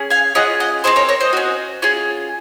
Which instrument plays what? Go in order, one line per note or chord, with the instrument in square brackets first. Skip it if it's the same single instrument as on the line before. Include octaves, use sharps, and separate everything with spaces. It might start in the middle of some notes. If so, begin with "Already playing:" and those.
Already playing: [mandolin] C#4 G#4
F5 G#5
C#4 F4 G#4 D#5 F#5
D#5 F#5
C4 F4 G#4 C5 D#5
A#4 C#5
A#4 C#5
C5 D#5
C#4 F#4
C#4 F4 G#4